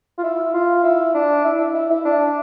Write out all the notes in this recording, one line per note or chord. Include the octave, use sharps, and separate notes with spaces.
F4
E4
F4
E4
D4
E4
E4
E4
E4
D4